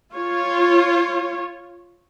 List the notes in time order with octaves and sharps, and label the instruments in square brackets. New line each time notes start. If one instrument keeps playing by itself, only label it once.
[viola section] F4 C#5